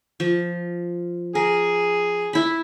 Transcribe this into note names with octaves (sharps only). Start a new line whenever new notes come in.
F3
G#4 A#4
E4 B5